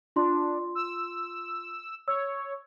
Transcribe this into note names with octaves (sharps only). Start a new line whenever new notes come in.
D4 F4 C6
E6
C#5 E6